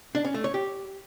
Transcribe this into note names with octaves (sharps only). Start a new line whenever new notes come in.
D4
C#4
A3
C#5
G4